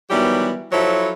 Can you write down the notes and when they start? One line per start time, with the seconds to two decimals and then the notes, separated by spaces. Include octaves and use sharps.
0.10 D#3 E3 F#3 G3 B3 G4
0.72 F3 F#3 E4 A4 C5 C#5